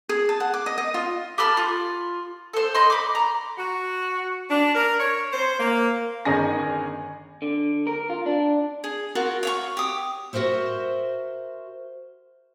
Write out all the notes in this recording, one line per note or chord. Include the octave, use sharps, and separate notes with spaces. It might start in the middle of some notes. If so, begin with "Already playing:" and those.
G#4
A5
F#5
D6
D#5
D#5
F4
G4 A4 B5 F6
F4
A4 C5
D#5 B5 C6
B5 D6
A#5
F#4
D4
A#4
C#5
C5
A#3
G1 D#3 C#4 G#4 G#5 A#6
D3
A#4
F4
D4
G#4
F4 F#4 A#4
C#5 F5 C#6
G4 D#6
F#4 G4 A#4 C5 E5